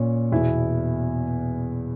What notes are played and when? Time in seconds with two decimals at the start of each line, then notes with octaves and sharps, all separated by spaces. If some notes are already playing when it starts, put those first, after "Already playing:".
Already playing: A#2 C#4
0.32 E2 B2 E4